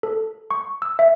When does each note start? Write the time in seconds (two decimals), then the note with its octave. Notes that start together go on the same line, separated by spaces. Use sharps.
0.03 A4
0.51 C#6
0.82 E6
0.99 E5